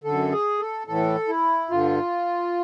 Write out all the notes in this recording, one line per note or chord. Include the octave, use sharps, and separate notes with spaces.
F#2 D3 A4
G#4
A4
A2 E3 A4
E4
G2 D3 F4